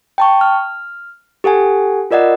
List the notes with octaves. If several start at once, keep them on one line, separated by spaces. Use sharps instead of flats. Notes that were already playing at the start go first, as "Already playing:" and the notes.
G5 A5 C#6
F6
G4 A4 F#5 G#5
F4 A#4 D5 D#5 F#5